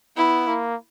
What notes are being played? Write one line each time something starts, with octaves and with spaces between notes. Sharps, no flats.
B3 E4
A#3